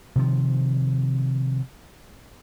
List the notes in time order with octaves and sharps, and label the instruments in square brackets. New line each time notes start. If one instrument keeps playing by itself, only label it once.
[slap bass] C3 D#3 F3